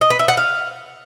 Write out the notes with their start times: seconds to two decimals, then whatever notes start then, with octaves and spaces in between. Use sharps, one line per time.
0.01 D#5
0.10 B4
0.19 E5
0.28 F#5
0.37 F5